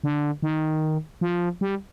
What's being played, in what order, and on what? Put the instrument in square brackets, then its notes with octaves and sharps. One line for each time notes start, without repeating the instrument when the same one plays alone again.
[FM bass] D3
D#3
F3
G3